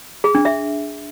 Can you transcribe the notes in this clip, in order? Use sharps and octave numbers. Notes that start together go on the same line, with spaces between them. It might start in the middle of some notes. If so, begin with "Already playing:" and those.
G#4
D4
E5